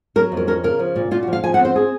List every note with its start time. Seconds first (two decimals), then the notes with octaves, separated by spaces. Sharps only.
0.16 F#3 A#4
0.32 F2
0.37 A#4
0.47 C#4 A#4
0.64 C#3 A#4
0.79 F3
0.96 A#2
1.11 A#2 F4
1.23 F#4
1.27 F3
1.33 F5
1.44 F3 G#5
1.54 F#5
1.59 C4
1.65 C5
1.76 G#4